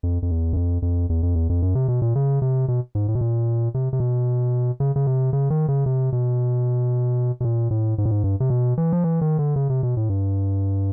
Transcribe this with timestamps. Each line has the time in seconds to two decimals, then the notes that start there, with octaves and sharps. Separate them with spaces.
0.03 F2
0.22 F2
0.30 E2
0.53 F#2
0.56 F2
0.82 F2
1.09 E2
1.23 F2
1.35 E2
1.49 F2
1.62 F#2
1.75 C3
1.88 B2
2.02 A#2
2.15 C#3
2.42 C3
2.68 B2
2.95 G#2
3.08 A2
3.15 B2
3.21 A#2
3.74 C3
3.93 C3
4.00 B2
4.80 C#3
4.96 C#3
5.06 C3
5.33 C#3
5.50 D#3
5.68 C#3
5.86 C3
6.12 B2
7.40 B2
7.44 A#2
7.71 A2
7.98 G#2
8.05 A2
8.11 G#2
8.24 G2
8.40 C3
8.50 B2
8.78 E3
8.93 F3
9.04 E3
9.21 D#3
9.39 D3
9.56 C#3
9.70 C3
9.83 B2
9.97 A2
10.09 G2